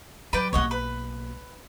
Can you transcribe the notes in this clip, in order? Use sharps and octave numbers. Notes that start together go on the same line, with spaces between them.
F#3 B4 D5 G5
B1 A#3 C#5 D#5 F#5
B4